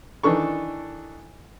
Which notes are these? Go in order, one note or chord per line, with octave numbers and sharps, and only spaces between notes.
D#3 E3 D4 A4 C#6